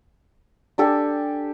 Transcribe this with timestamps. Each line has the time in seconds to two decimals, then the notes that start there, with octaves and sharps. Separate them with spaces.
0.78 D4 G4 A4 G#5